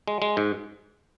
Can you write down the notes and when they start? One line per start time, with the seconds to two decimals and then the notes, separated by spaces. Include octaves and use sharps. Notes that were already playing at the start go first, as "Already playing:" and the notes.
0.08 G#3
0.22 G#3
0.37 G#2